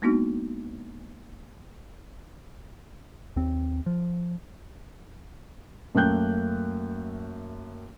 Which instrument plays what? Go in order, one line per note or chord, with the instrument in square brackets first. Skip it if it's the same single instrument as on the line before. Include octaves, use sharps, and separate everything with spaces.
[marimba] G#3 A#3 B3 D4 D#4 F#4
[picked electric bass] D#2 C4
F3
[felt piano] F#2 A3 A#3 G5 F#6 G6